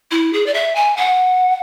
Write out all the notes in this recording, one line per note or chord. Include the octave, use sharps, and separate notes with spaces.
E4
G#4
D5
E5
G#5
F#5